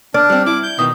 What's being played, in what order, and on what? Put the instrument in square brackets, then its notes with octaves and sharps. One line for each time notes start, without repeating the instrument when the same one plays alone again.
[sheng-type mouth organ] D4 [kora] D5 [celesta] F6
[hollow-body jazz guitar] G3 C4
[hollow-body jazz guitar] E4 [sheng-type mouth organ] D6
[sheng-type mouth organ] G6
[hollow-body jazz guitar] B2 D#3 B3 [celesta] D#6